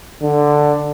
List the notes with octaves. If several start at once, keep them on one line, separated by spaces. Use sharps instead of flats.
D3